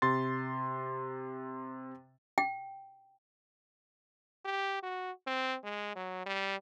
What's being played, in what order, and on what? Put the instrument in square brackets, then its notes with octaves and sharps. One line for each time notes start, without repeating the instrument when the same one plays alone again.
[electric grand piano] C3 C6 A6
[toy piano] G5
[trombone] G4
F#4
C4
G#3
F#3
G3